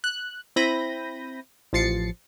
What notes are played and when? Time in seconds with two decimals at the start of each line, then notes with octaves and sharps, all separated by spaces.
0.04 F#6
0.56 C4 E4 B5 G6 A#6 D#7
1.73 A1 F3 A6 C7 C#7